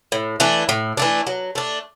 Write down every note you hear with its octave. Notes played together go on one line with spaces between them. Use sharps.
A2
E3 A3 D4
A2
E3 A3 D4
F#3
A3 D4